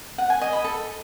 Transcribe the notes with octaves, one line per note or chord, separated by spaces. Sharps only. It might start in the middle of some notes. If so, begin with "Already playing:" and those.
F#5
G#5
D#5
B5
A4